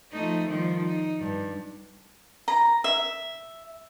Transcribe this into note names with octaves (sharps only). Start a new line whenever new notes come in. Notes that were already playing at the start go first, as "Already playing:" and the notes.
F3 A3 D#4
D#3 F3 G3
D#4
G2
A#5
E5